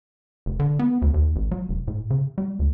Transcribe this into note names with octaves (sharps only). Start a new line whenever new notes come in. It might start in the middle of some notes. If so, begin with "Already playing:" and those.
F1
D3
B3
D2
D#2
A1
F#3
F1
A2
C#3
G3
D2